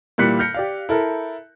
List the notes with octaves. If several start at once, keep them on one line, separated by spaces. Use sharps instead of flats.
A#2 E3 G3 F#6 B6 C#7
F6 G6 A#6 C#7
G4 D5 F5
E4 A4 A#4